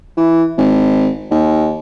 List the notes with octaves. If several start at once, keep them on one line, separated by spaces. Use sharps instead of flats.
E3
G#1
D#2